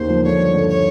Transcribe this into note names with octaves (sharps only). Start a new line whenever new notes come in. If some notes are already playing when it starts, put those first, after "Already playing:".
Already playing: D#2 C#3 C5
F3
D3 C#5
G2
D3
C#5